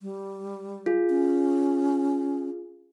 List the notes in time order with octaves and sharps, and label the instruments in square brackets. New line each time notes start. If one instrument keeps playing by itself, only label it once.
[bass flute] G3
[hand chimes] F4 G#4
[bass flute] C#4